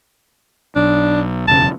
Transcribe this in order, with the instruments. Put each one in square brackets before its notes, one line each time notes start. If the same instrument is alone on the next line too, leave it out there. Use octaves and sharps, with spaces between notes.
[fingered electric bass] B1 [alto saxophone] D4
[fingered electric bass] E1 F#2 C#3 [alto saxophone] A5